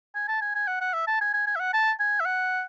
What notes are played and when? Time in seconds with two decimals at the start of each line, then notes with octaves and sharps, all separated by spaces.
0.15 G#5
0.28 A5
0.41 G#5
0.55 G#5
0.67 F#5
0.81 F#5
0.94 E5
1.07 A5
1.21 G#5
1.34 G#5
1.47 G#5
1.55 E5
1.60 F#5
1.73 A5
2.00 G#5
2.20 E5
2.26 F#5